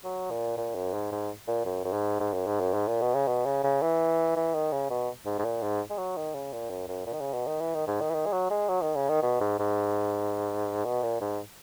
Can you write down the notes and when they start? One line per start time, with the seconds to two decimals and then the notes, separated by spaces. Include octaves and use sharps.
0.04 F#3
0.30 A#2
0.57 A#2
0.75 F#2
0.94 G#2
1.12 G#2
1.48 A#2
1.65 F#2
1.84 F#2
1.93 G#2
2.20 G#2
2.33 F#2
2.47 G#2
2.60 F#2
2.74 G#2
2.88 A#2
3.01 B2
3.15 C#3
3.28 B2
3.45 C#3
3.64 C#3
3.82 E3
4.36 E3
4.54 D#3
4.72 C#3
4.90 B2
5.26 G#2
5.39 G#2
5.44 A#2
5.62 G#2
5.90 G#3
5.98 F#3
6.17 D#3
6.34 C#3
6.52 A#2
6.70 F#2
6.88 F#2
7.06 A#2
7.13 D#3
7.20 C#3
7.33 B2
7.47 D#3
7.60 E3
7.75 D#3
7.87 G#2
8.01 D#3
8.10 E3
8.14 D#3
8.26 G#3
8.32 F#3
8.50 G#3
8.69 F#3
8.82 D#3
8.95 C#3
9.09 D#3
9.22 B2
9.40 G#2
9.59 G#2
10.85 B2
11.03 A#2
11.21 G#2